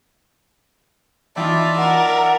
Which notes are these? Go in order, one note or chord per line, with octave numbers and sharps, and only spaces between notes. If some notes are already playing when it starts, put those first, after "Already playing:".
E3 D#4 F4 D5 E5 G5 A5
F4 A#4 F#5